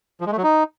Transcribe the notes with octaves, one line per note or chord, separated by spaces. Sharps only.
F3
G#3
A3
F#3
D#4